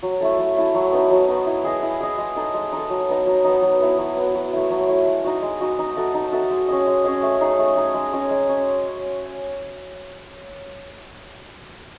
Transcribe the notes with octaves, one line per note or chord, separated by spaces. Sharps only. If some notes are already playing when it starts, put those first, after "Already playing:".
F#3
A3 E4 A4
F#3
A3 E4 A4
F#3
B3 D#4
F#3
B3 D#4
E4
G#4 D#5
E4
G#4 D#5
G#3
D#4 A4
G#3
D#4 A4
F#3
B3 D#4
F#3
B3 D#4
F#3
B3 E4 B4
F#3
B3 E4 B4
F#3
A3 E4
F#3
A3 E4
G#3
D#4 F#4
G#3
D#4 F#4
D#4
F#4 A4 E5
D#4
F#4 A4 E5
G#3
C#4 G#4 D#5
G#3
C#4 G#4 D#5
A3
D#4 G#4
A3
D#4 G#4
G#3
C#4 G#4 D#5
G#3
C#4